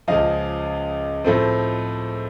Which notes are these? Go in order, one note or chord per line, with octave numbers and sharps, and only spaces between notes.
C#2 C#3 F3 D#5 F5
A2 F3 A3 C4